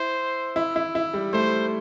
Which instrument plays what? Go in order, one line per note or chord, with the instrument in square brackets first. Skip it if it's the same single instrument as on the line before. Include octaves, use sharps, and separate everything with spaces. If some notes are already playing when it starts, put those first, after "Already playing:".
Already playing: [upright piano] E4 [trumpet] C5
[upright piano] E4
E4
E4
G3
[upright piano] A3 [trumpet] C5